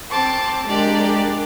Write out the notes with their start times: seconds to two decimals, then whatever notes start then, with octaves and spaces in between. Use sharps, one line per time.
0.11 C4 C5 A5 D6
0.68 G#3 D4 G4 A#4 D5